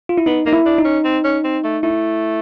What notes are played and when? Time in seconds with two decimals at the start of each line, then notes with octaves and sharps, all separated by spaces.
0.09 F4
0.18 E4
0.26 B3 D#4
0.46 A#3 D#4
0.53 E4
0.66 D4
0.79 D#4
0.85 C#4
1.05 C4
1.24 C#4
1.44 C4
1.64 A3
1.83 A3 E4